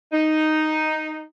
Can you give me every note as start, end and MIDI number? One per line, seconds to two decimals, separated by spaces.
0.13 1.22 63